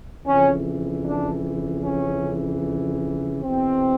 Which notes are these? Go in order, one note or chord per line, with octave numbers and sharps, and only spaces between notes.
F2 C#3 E3 C#4
D4
C#4
E2 B2 C4